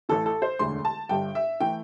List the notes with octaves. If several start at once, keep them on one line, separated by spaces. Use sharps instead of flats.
A1 A2 E3 A4
A4
C5
E1 D2 D3 A3 C6
A5
G1 G2 G3 G5
E5
E3 A3 G5